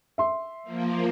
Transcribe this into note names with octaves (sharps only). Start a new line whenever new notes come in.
E5 C6
F3 A#3